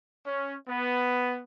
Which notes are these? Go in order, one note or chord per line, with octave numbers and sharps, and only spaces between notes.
C#4
B3